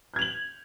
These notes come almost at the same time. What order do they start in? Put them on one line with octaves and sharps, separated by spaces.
G6 G#6 F7 F#7